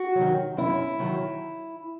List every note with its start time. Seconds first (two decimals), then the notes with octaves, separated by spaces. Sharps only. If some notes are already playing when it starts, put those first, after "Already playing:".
Already playing: F#4
0.15 F#3
0.21 D#3
0.57 F#2 E4
0.99 D#3 F#3